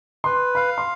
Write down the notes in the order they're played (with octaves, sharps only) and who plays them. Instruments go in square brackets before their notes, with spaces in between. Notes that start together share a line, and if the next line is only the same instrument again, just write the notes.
[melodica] B4 [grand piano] C6
[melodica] F5 [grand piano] B5
[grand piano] C6